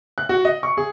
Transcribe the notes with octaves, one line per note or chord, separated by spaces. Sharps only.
F#6
F#4
D#5
C#6
G#4